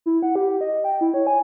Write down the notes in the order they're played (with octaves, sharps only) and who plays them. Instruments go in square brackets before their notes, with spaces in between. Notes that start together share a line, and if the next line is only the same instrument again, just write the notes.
[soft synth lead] E4
F#5
G4
D#5
G5
E4
C#5
G#5